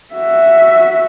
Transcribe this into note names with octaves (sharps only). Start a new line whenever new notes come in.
F#4 E5